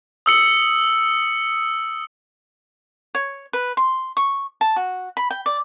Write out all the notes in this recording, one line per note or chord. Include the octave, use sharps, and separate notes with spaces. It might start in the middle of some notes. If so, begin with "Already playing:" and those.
D#6 E6 C#7 F#7
C#5
B4
C6
C#6
A5
F#4
B5
G5
D5